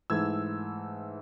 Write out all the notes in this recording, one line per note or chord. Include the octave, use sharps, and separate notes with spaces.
G#2 E3 A3 E6 G#6